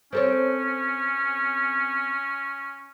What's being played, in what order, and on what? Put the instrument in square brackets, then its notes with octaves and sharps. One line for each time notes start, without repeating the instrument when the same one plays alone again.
[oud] C4 A4 C#5 [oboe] C#4